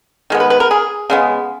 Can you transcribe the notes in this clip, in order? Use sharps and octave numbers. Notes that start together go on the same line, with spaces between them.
D#3 G#3 B3
B4
B4
A#4
G#4
C#3 G#3 B3